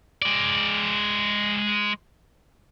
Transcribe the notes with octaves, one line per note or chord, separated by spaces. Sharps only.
G#3 D5